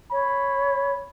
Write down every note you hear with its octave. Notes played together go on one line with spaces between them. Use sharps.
C#5 B5